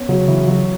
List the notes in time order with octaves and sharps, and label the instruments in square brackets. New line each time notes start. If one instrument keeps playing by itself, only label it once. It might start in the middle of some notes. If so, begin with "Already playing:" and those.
Already playing: [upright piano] B3 C#4
[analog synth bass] C#3 [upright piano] F#3
[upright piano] E3
F#3